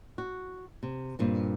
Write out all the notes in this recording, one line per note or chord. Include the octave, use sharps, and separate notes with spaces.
F#4
C3
G2 A#2 C4